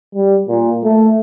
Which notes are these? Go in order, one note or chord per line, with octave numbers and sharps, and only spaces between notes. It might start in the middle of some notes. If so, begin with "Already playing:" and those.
G3
A#2
A3